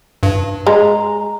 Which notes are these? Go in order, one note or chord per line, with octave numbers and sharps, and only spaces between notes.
G2
G#3 A#5